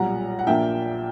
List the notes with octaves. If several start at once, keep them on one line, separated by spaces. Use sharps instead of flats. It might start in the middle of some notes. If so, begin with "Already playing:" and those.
Already playing: B1 A#2 G3 F#5 A#5
F#5
A#1 A#2 A#3 D4 E5 G5